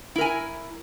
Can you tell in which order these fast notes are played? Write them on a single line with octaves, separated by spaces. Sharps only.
E4 A#4 G#5